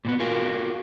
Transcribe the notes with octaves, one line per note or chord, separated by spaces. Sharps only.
A#2 D#3 B3
F4 F#4 G#4 A#4 F5